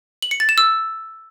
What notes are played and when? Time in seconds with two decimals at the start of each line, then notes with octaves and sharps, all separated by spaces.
0.22 F#7
0.31 C#7
0.40 A6
0.49 E7
0.58 E6